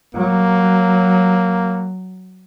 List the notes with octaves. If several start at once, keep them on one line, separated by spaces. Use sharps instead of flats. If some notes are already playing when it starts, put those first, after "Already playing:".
F#3 A#3